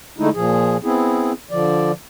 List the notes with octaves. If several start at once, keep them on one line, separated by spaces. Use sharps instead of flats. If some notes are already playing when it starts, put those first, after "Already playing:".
D3 G#3 A3 D#4 E4
A#2 F3 G#4
B3 C4 E4 G#4
D3 F3 D5